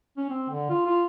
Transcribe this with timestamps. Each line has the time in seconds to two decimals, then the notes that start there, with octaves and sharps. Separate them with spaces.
0.17 C#4
0.30 C4
0.49 D3
0.70 F4
0.86 F4